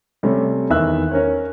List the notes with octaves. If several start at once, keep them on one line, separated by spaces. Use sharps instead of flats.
C3 G3 A3 C#4
E2 D#3 E5 E6 F#6
C#4 A#4 C#5